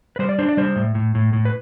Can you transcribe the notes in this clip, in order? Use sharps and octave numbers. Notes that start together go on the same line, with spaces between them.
B4
G3 C5
D5
D4 C5
D5
G3 C5
A2
A2
A2
A2
B4